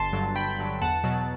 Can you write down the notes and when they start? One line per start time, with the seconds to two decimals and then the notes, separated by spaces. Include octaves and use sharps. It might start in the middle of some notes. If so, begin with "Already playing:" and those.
Already playing: G1 A5 C6
0.13 G2 D3 F#3
0.36 G1 G5 B5
0.59 G2 D3 F#3
0.82 E2 F#5 A5
1.04 B2 F#3